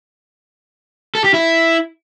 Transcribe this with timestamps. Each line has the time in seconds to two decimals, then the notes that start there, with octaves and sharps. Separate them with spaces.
1.15 A4
1.24 G4
1.34 E4